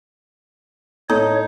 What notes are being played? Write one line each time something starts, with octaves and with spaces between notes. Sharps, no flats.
A2 A3 D#4 C#5